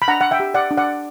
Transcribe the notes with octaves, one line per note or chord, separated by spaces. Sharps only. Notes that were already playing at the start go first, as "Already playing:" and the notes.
B5
D4 F#5 A#5
F#5
E5 G5
G4
D5 F#5
D4
D5 F#5